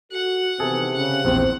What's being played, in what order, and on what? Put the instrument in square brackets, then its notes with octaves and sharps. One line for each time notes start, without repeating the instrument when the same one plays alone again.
[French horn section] F#4 A4 [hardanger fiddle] F#5
[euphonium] C3 [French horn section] D#3 E3 B3 [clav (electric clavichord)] G#4 A4
[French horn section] C#3 [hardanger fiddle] F#5
[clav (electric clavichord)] A#1 E2 [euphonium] C4 [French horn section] C5